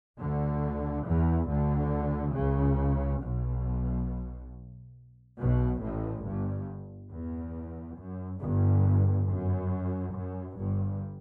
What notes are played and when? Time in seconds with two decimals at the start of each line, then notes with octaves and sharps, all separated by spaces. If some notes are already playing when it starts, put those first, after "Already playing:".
0.19 D2 D3
1.05 E2 E3
1.49 D2 D3
2.35 C#2 C#3
3.21 B1 B2
5.38 B1 B2
5.81 A1 A2
6.24 G1 G2
7.10 E2
7.97 F#2
8.40 G1 G2
9.26 F#2
10.13 F#2
10.57 G1 G2